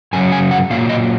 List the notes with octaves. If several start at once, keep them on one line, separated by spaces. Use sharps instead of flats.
F#2 C#3 F#3 C#4 G#5
G#5
F#5
A#2 F#3 A#3 F5
D#5